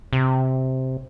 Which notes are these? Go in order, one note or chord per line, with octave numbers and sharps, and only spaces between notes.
C3